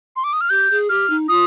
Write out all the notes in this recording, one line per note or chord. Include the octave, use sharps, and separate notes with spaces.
C6
D6
D#6
F6
G4 G6
G#4
G4 F6
D#4
F4 D#6